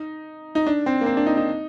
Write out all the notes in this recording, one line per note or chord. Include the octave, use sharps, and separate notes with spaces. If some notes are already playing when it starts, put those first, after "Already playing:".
Already playing: D#4
D#4
D4
C4
A#3
C4
D4
D#4
D#4